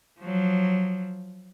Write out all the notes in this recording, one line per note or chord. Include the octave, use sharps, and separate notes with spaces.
F3 F#3